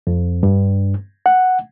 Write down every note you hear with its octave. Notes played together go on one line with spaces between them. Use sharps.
F2
G2
F#5